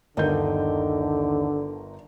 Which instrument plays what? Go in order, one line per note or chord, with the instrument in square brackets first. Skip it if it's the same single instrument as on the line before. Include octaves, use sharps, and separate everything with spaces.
[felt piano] G1 A#4 G6 [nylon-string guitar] D#2 D#4 [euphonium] D3